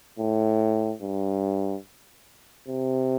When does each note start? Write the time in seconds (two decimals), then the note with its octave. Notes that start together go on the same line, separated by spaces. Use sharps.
0.19 A2
1.02 G2
2.68 C3